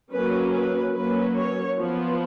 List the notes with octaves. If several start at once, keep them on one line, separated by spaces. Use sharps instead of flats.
F#3 A#3 C#4 B4
B4
F#3 A#3 C#4 B4
C#5
F3 B3